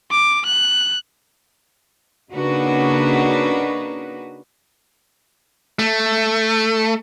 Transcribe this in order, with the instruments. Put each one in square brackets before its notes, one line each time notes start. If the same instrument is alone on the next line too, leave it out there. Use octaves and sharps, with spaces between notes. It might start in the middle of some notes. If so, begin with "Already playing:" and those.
[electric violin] D6
F#6
[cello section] C#3 A#3 D4 D#4 F#4 B4
[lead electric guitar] A3